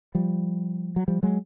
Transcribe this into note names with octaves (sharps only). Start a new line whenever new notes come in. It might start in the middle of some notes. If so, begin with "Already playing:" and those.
F3 G3
F#3
F3 G3
F#3 G#3